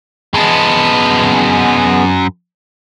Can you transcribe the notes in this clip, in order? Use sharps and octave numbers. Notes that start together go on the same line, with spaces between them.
F#2 G#3 B3 A5